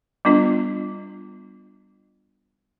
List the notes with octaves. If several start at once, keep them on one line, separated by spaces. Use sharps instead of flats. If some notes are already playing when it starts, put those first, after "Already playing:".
G3 B3 D4 F4